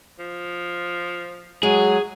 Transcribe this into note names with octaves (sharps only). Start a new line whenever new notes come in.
F3
F#3 G#3 G#4